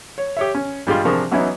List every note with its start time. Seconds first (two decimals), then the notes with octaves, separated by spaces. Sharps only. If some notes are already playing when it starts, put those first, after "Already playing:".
0.18 C#5
0.37 G4 C#5 E5
0.55 C#4
0.87 G2 G3 G#3 F4
1.05 C3 F3 D4 G#4 A#4 C#6
1.31 E3 F#3 B3 C#4 D#4 E4